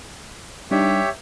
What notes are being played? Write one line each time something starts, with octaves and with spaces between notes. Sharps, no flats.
G3 D4 D#4 G4 C#5 E5